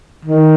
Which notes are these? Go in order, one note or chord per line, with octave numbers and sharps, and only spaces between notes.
D#3